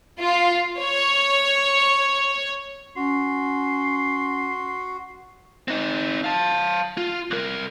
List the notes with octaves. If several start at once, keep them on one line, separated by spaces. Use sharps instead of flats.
F4
C#5
C#4 F#4 C6
C4 D#4
F5 A5
F4
C2 A#4